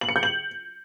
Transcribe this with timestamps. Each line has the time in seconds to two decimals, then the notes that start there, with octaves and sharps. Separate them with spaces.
0.01 F#7
0.09 C#7
0.16 G6
0.23 F#7